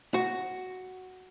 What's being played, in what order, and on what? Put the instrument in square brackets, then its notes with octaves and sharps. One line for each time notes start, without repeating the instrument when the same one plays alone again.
[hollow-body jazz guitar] F#4